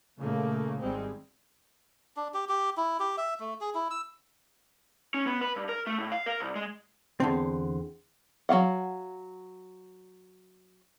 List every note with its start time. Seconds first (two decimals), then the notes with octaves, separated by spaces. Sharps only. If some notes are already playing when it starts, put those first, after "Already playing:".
0.18 A#2 C#3 A3 A#3
0.80 G#1 G3 G#3 C4
2.17 D4
2.34 G4
2.49 G4
2.77 E4
2.99 G4
3.18 E5
3.40 A3
3.61 G#4
3.75 E4
3.91 E6
5.14 C#4
5.27 B3
5.41 B4
5.56 G2
5.69 A#4
5.87 A3
5.99 A2
6.12 F5
6.26 A#4
6.40 C2
6.55 G#3
7.20 E2 D3 C4
8.49 F#3 F4 F5 F#5